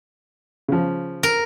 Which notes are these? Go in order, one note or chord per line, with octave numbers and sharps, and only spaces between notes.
C#3 F3
A#4